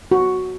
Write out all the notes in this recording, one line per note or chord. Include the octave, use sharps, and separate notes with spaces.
F#4